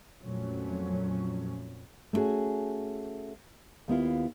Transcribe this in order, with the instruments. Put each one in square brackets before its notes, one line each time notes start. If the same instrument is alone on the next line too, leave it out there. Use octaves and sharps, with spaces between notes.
[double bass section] F2 A#2 F#3 A3 C#4
[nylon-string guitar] A3 B3 C#4 F#4 G#4
D#2 B3 E4 F4